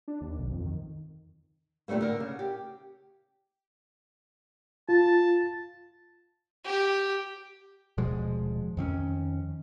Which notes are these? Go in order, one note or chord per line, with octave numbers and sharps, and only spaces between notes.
D4
D#2
B1
F2
D#3
A#2 D3 G3 A3 A#3
D3 A#4
C#3
G4
F4 A5
G4
D#1 B2 F3 G#3
F2 D#3 C4 C#4